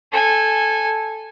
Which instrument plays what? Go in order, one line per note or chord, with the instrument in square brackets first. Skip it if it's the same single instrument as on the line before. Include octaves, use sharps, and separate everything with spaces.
[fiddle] A4 G#5